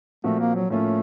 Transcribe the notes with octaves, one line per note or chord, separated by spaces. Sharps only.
A#2 F3 A3 C4 F#4 A#4
A#3
F#3
A2 F3 A3 A#3 C#4 F4